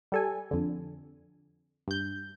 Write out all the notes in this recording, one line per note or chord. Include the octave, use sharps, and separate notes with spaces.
G3 A4 G#5
F2 D3
G2 G6